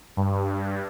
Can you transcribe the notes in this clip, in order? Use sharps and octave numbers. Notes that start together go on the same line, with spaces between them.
G2